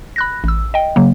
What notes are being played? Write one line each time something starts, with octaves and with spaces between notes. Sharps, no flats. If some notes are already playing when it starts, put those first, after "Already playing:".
B5 F#6 A#6
A1 E6
D#5 G5
C#3 F#3 A#3